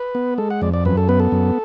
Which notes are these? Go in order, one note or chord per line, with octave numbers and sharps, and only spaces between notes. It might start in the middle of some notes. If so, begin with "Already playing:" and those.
Already playing: B4
B3
G#3 A4
F#5
F2 D5
D5
F#2 B4
A4
B3 B4
A4
F#2